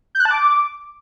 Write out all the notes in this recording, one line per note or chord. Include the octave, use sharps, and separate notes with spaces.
G6
F#6
A5
D6